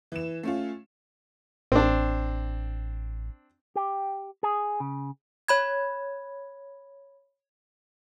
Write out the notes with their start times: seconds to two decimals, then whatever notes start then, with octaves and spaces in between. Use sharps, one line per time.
0.12 E3 E7
0.43 A3 C#4 F4
1.72 A1 C4 D4
3.76 G4
4.43 G#4
4.80 C#3
5.48 C#5 B5 G#6